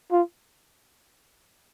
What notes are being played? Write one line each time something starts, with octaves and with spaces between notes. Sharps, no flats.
F4